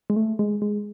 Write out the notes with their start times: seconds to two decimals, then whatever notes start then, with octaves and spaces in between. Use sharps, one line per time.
0.10 G#3
0.16 A3
0.39 G#3
0.62 G#3